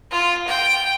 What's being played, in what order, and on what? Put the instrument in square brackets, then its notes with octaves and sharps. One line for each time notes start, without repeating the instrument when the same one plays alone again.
[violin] F4
G5